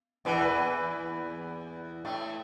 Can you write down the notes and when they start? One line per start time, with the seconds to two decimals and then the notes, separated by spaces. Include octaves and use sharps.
0.25 E2 E3 B4
0.33 D5
0.41 B4
2.05 A2 A3